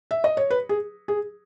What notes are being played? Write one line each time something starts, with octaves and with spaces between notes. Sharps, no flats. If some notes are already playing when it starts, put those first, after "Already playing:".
E5
D#5
C#5
B4
G#4
G#4